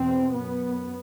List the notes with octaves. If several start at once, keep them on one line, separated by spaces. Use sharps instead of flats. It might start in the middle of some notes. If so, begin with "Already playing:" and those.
Already playing: E2 B2 C4
F#2 B3